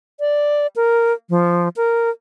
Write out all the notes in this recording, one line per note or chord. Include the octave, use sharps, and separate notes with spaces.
D5
A#4
F3
A#4